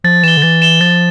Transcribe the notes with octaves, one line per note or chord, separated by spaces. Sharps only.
F3 A6
E3 E7 G7
D3
E3 A6
E7 G7
F3 A6